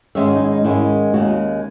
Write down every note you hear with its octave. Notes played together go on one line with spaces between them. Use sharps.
G#2 D#3 G#3 C#4 E5
F#4
D#4
E4
D#4
G#2 D#3 G#3 C#4 E4
D#2 C#3 G#3 F#4